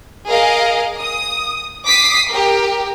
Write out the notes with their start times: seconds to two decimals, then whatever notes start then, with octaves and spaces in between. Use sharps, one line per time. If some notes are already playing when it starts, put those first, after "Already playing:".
0.28 G#4 A#4 D#5 F5
1.00 D#6
1.86 D6 D#6 B6 C7
2.28 G4 A#4